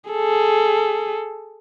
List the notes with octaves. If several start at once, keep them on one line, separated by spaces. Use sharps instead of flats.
G#4 A4